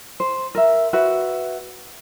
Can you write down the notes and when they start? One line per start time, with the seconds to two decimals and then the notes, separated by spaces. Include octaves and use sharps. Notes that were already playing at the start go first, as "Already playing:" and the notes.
0.20 C5
0.55 A#4 E5
0.93 F#4 B4 E5